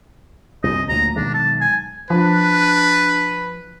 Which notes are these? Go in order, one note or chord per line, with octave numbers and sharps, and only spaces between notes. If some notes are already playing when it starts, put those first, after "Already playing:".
C2 F#2 D#5
D2 A#2 F#3 A#5
B1 D#3 G#3 D4
A5
G#5
F3 D4 B4